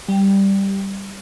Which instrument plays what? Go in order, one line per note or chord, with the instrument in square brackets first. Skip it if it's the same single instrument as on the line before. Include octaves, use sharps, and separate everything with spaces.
[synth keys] G3